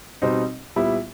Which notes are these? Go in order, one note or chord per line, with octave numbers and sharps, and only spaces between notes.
B2 G3 C4 D#4
A#2 G3 B3 E4